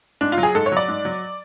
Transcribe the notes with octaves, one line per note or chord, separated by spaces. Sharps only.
G#2 D4
F4
F#3
G#4
G#2 A4
C#5
F#3 D5
G#2
F#3